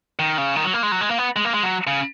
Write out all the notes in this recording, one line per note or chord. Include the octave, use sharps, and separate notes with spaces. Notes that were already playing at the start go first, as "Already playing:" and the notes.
D#3
C#3
D#3
F#3
A#3
G#3
F#3
G#3
A#3
B3
G#3
A#3
G#3
F#3
C#3